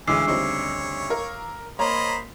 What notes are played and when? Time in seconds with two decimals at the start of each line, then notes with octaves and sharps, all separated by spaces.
0.07 D2 C#3 E3 G#3 C#4 D6 E6 C7
0.27 G3 C4 D#4 C#5
1.10 A#4 F5
1.79 A#3 C5 C#5 D#5 A#5 B5